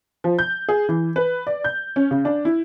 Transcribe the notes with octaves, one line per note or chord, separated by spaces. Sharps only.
F3
G6
G#4
E3
B4
D5
G6
C#4
C#3
D4
E4